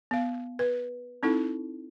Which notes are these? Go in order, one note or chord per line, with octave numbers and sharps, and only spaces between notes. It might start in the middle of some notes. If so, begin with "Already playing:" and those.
B3 F5
B4
C4 D#4 E4 A4